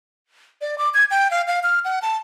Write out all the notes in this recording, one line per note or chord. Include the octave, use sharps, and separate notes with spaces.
D5
D6
G#6
G5
F5
F5
F6
F#5
A5